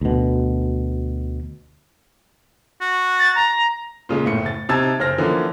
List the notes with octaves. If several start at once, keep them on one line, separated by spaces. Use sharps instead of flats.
D2 B2
F#4
A6
A#5
A#2 C#3 G#3
F#1 A2 C#7
A6
C3 D#4 A5 E6 G#6 A6
F#1 C5 F6 A#6
D3 E3 F3 A#3 C#4